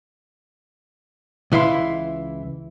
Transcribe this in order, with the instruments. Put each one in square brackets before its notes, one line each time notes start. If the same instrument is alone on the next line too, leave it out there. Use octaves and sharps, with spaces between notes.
[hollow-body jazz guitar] C#2 E3 E4 F5 C6